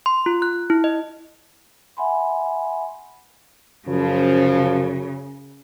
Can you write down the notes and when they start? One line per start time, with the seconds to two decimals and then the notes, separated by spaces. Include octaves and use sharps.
0.06 C6
0.26 F4
0.42 F#6
0.70 E4
0.84 D#5
1.97 E5 F#5 G#5 B5 C6
3.88 F#2 C#3 F3